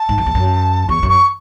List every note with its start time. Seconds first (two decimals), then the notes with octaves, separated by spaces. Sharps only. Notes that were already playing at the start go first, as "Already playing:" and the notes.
Already playing: A5
0.09 G#2
0.18 F#2
0.26 E2
0.35 F#2
0.89 E2 C#6
1.03 F#2
1.09 C#6